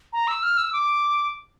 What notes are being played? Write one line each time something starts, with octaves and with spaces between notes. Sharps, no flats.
A#5
E6
F6
E6
D6